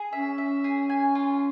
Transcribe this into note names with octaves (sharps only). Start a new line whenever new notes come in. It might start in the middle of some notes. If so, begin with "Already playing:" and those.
Already playing: G#4
C#4 E5
E5
G#4
G#5
F4